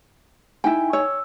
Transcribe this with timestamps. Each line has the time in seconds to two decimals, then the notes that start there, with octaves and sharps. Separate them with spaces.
0.64 D#4 E4 G5 G#5
0.93 C#5 E6